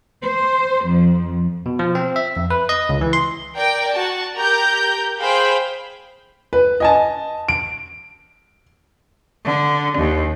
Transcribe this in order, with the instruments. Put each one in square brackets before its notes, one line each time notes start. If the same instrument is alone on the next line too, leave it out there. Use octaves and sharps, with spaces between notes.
[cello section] C5
F2
[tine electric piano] B2
F3
C4
E5
F2
B4
D#5
C#2
E3
C6
[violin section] A#4 D5 G5
F#4 A5
G4 A#4 A#5 G6
G#4 C5 F5 G5 B5
[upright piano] B4
D#5 G#5 A5
D7
[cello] D3
D#2